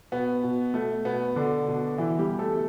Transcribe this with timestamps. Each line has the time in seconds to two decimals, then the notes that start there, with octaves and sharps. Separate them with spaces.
0.12 B2 B3
0.43 B2
0.74 B2 A3
1.05 B2 B3
1.36 B2 D3 D4
1.67 B2
1.98 B2 E3 E4
2.19 G3 G4
2.29 B2
2.39 A3 A4